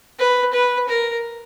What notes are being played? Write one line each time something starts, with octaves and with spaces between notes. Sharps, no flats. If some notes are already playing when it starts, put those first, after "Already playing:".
B4
B4
A#4